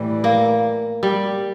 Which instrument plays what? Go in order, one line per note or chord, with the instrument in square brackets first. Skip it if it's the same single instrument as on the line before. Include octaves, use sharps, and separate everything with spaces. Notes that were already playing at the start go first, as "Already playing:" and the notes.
Already playing: [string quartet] A2 E3 G3
[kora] A#3
G3